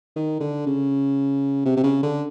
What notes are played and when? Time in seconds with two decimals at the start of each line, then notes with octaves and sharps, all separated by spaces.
0.16 D#3
0.40 D3
0.66 C#3
1.65 C3
1.76 C3
1.83 C#3
2.03 D3